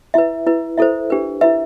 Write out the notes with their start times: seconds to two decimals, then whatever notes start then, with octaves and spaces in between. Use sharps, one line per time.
0.14 E4 B4 E5
0.47 E4 B4
0.78 E4 A4 C5 E5
1.10 D4 G4 B4
1.41 E4 B4 E5